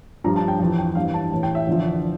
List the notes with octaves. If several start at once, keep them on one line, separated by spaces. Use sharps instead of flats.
G2 F3 A#5
A5
G5
F2 E3
G5
G2 E3 F5
A5
A2 E3 A5
G5
E5
E2 D3 F3